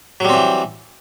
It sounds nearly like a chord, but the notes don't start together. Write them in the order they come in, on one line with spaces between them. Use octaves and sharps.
F#3 G3 C4 E3